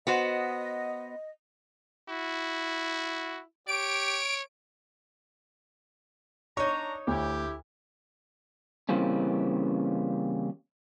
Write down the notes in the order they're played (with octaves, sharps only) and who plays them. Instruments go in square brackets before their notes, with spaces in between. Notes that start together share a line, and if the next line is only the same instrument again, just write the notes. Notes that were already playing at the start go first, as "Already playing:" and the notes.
[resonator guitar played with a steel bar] B3 F#4 C5 [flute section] D#5
[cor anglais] E4 [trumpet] F#4
[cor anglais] G4 [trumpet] C#5 [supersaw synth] D7
[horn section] D4 A#5 [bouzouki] D#4 C#5 [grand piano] C#6
[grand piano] D2 [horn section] E4 G4
[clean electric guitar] C#3 E3 G3 A#3 C4 C#4